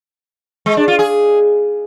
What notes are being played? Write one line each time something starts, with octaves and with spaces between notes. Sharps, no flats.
G#3
D4
F4
G#4